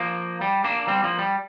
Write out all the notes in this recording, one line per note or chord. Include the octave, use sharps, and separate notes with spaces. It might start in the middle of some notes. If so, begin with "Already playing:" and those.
Already playing: F3 A#3
G3
A#3 D4
G3 C4
F3 A#3
G3